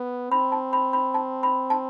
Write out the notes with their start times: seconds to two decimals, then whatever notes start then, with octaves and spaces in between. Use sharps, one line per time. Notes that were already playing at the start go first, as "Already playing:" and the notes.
Already playing: B3
0.31 C4 B5
0.52 A5
0.73 B5
0.93 B5
1.14 A5
1.43 B5
1.70 A5